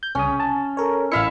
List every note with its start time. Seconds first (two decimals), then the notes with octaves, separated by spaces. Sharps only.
0.03 G6
0.15 C2 C#3 C#4 D#6
0.40 A5
0.77 A4 A#4 C#5
1.12 A1 E4 E5 F5 F6 C#7